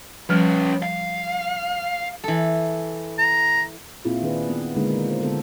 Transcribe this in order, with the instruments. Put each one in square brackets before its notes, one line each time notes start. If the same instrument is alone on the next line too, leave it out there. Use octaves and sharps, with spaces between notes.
[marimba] F3 G3 F6 [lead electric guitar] C#4 B4
[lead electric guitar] F5
[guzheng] E3 A4
[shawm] A#5
[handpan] A#2 C4 E4 F4 G#4
D#3 D4 G#4 B4
B3
D3 G#3 A#3 D4 D#4
F4 C5
D3 B3 A4